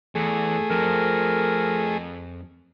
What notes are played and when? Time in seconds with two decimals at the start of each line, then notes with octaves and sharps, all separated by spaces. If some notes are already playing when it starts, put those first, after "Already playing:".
0.15 E2 A3 G#4
0.70 F2 A#4